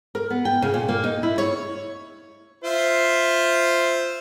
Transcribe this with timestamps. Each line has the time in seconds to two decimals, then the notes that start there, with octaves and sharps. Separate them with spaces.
0.15 A#4
0.30 B3
0.45 G5
0.62 C#3
0.74 A#2
0.89 A#3
1.04 D#4
1.23 E4
1.38 C#5
2.64 F4 C5 E5